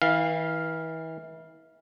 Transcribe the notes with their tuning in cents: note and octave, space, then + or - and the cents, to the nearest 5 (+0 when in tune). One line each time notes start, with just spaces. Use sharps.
E3 -35 F5 +0